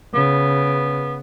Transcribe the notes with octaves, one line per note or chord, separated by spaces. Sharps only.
C#3 B3